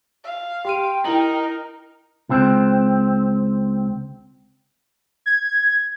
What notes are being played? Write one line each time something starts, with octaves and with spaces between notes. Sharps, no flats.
F5
G4 G5 C6 D#7
D#4 E4 A#4 F#7
C#2 C4
G#6